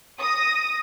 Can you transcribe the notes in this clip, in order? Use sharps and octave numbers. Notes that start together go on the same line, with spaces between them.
D#6 A#6